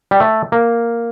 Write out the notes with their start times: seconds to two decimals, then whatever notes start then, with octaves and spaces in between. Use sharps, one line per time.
0.11 G3
0.20 A3
0.52 A#3